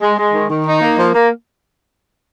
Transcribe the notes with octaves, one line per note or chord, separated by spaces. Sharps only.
G#3
G#3
D#3
D#3
D#4
A#3
F3
A#3